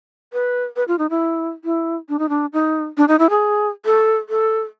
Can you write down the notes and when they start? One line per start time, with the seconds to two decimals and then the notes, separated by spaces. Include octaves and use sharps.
0.33 B4
0.76 B4
0.88 F4
0.99 D#4
1.10 E4
1.65 E4
2.09 D4
2.19 D#4
2.29 D4
2.53 D#4
2.97 D4
3.08 D#4
3.19 E4
3.30 G#4
3.85 A4
4.29 A4